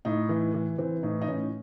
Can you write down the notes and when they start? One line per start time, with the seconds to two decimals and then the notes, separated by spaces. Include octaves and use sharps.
0.05 A2 D#4
0.29 E3
0.54 E3
0.78 E3 C4
1.03 A2 D#4
1.22 D#4
1.28 A2 C#4